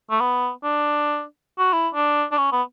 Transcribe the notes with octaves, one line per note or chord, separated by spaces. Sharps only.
A3
B3
D4
F#4
E4
D4
D4
C#4
B3